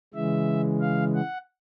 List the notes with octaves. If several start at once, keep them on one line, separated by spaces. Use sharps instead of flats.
C#3 E3 G#3 E5
F5
F#5